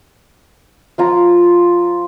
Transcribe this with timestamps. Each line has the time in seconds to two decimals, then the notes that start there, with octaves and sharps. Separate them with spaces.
0.98 F3 F4 A#5